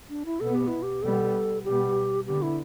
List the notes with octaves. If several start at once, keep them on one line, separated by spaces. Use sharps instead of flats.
D4
E4
B2 B3 A4
G4
E4
G4
B2 G3 B3 A4
B2 G3 B3 G4
D3 B3 G4
E4